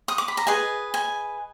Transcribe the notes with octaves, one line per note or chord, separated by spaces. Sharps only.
D#6
D6
B5
A#5
G#4 B4 D#5 G#5
G#5